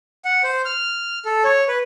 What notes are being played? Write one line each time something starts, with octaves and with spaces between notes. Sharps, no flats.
F#5
C5
F6
A4
C#5
B4